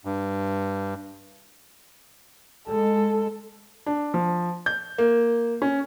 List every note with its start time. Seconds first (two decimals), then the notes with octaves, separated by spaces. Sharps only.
0.05 G2
2.68 G#3 A4
3.86 D4
4.14 F3
4.66 G6
4.98 A#3
5.62 C#4